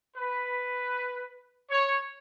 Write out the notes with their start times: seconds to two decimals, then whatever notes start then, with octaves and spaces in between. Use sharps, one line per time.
0.17 B4
1.70 C#5